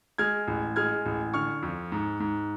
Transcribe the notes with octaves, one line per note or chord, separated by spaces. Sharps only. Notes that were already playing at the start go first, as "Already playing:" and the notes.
G#3 F6 G#6
A1
G#3 F6 G#6
A1
D3 C#6 F6
F2
G#2
G#2